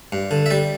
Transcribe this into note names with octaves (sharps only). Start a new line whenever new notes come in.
G2
D3
E5
G3 D5